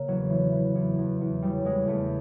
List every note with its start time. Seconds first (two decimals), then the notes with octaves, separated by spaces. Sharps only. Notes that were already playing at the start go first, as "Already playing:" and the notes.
Already playing: C#3 A#3
0.08 E2 F#3
0.30 E3
0.53 E3
0.75 E2
0.98 E2
1.21 E2
1.42 C#3 G3
1.65 E2 G#3
1.87 E2 A3